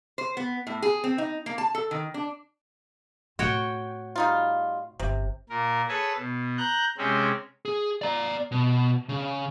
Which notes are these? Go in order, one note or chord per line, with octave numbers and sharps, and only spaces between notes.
C5
B3
A2
G#4
C4
D#4
A#3
A5
A4
D#3
D4
A2 C4 F#4 C#5 G5
G3 D#4 F4
G1 C3
A#2 A#4
G#4 A4 B4 C#5 G#5 A5
B2
A#5 F#6 G6
C3 G#3 C4 C#4
G#4
D5 A#5
B2
C#3